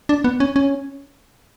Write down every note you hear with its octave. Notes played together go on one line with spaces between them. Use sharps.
D4
B3
C#4
C#4